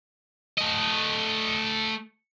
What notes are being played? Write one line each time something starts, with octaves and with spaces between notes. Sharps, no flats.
A3 D#5